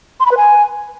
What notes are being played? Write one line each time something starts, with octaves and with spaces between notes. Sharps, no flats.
C6
B5
B4
G#5